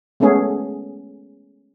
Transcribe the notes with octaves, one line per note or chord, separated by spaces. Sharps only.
G#3 A3 B3 C#4 G#4